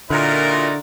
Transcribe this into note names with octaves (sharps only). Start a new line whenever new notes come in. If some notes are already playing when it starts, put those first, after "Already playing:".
A#2 D3 D#4 E4 F#4 A#4 D5 C6